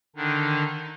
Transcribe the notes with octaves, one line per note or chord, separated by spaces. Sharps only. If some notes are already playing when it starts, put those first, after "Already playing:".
D3 D#3 D4 D#4